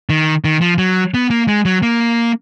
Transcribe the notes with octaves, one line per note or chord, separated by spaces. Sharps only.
D#3
D#3
F3
F#3
B3
A#3
G#3
F#3
A#3